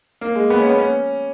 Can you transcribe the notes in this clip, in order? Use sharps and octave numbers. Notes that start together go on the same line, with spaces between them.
A#3
G#3
B3
C#4
B3
C#4